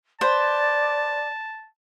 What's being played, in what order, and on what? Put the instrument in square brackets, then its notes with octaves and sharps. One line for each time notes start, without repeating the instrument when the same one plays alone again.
[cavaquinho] B4 C5 [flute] D5 [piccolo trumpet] A5